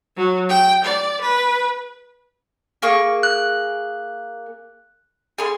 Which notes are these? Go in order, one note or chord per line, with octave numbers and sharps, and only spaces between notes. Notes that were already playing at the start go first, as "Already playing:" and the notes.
F#3
G5
D5
B4
A#3 G#4 C#6
F#6
G#4 C6